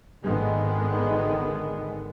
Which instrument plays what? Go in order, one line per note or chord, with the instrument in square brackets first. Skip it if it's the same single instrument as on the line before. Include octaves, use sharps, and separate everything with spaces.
[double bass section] G#1 D3 D#3 G#3 B3